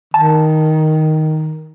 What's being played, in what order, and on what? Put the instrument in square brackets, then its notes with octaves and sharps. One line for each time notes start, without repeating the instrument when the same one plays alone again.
[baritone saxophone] D#3 [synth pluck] A5